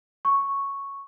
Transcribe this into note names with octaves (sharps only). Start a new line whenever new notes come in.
C#6